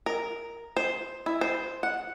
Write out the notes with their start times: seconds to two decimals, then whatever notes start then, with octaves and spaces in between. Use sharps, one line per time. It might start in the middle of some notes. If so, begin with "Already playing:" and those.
0.06 A#4
0.77 C5
1.26 E4
1.41 C5
1.83 F#5